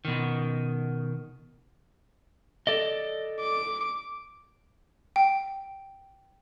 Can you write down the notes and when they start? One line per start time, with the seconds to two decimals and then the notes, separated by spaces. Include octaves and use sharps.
0.05 B2 D#3
2.67 A4 D5 D#5
3.40 D6
5.16 G5